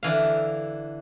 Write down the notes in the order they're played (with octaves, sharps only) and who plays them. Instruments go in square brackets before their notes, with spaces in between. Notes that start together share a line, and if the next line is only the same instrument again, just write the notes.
[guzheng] D3 E3 F5